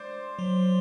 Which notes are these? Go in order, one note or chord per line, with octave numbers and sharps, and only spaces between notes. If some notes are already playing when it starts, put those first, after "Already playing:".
Already playing: C5 D5
F#3